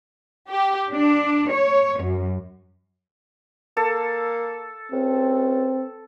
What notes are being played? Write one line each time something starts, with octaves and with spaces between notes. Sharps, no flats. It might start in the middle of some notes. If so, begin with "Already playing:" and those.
G4
D4
C#5
F#2
A#3 A4
C#2 C4